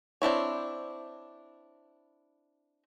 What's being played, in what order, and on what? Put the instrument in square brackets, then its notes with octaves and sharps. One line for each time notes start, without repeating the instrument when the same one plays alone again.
[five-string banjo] C4 D4 E4 C#5